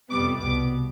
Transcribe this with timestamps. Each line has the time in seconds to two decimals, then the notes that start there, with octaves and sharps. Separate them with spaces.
0.11 F2 C3 G3 B3 D6
0.40 C2 B2 B3 D6